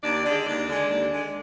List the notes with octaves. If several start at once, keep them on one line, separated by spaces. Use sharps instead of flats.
D#2 D4 D5
D3 G#3 D4 D5
D#2 D4 D5
D3 G#3
D#2
D3 G#3